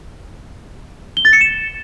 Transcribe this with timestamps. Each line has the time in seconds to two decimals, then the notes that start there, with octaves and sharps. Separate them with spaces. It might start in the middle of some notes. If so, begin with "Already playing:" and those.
1.17 G7
1.25 A6
1.33 C#7
1.41 E7